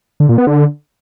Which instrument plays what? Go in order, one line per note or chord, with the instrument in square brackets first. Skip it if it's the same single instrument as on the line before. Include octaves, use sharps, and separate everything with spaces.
[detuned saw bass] D3
A#2
B3
D3